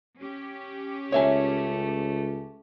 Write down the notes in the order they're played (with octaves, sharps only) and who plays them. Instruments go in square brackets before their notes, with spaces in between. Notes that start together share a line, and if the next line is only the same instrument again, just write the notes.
[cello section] C#4 G4
[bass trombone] C#2 [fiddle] A3 [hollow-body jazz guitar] C#5 E5 G#5